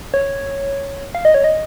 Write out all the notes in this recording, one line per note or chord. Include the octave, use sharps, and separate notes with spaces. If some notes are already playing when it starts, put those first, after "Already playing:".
C#5
F5
D#5
C#5
D#5